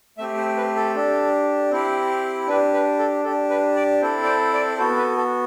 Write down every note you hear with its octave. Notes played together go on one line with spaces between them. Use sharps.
A3 C4 G4 E5
C5
B4
A4
D4 G4
C4 E4 G4
D4 G4 B4
B4
A4
D4 G4 A4
B4
D5
C4 E4 A4 C5
D5
C5
D5
B3 F#4 A4 C5
B4
A4